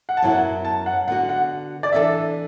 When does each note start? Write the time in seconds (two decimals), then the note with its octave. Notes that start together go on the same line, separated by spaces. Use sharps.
0.09 F#5
0.17 A5
0.22 F#2 F#3 B3 E4 F#5
0.65 A5
0.86 F#5
1.08 D3 B3 F#4 F#5
1.29 F#5
1.83 D5
1.92 E3 D4 A4 E5